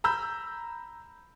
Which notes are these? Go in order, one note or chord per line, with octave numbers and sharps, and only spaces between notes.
A#5 B5 E6 G6